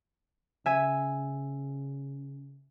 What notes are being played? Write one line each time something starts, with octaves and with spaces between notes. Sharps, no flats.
C#3 E5 G#5